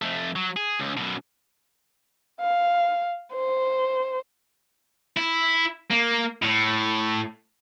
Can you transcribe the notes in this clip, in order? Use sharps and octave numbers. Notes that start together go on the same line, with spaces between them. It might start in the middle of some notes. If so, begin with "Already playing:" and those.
F2 A3
F#3
G#4
C#2
F#2 B2
F5
C5
E4
A#3
A2